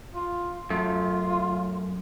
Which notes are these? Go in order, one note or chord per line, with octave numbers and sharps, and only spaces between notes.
F4
F#2 A3 F4